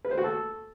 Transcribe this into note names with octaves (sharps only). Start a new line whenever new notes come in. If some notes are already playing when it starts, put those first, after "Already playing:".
B4
C5
F#4
A4